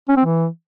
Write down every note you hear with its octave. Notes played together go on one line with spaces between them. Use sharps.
C#4
C4
E3